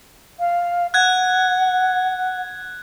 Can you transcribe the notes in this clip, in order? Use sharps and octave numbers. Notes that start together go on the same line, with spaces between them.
F5
F#5 F#6 G#6